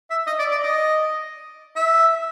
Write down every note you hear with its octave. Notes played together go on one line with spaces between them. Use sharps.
E5
D#5
D5
D5
D#5
E5